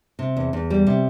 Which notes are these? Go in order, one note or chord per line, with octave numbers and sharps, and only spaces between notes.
C3
E2
E2
G3
C3